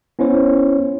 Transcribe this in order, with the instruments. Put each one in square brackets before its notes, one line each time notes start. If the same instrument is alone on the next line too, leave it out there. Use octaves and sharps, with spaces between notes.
[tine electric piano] B3 C#4 E4 C5 C#5